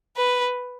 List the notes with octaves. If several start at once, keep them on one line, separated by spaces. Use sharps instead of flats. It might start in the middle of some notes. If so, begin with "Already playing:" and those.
B4